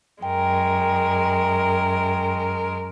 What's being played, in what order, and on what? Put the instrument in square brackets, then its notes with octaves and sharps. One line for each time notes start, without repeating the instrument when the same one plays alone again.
[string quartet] F#2 G#3 A#4 [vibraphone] G5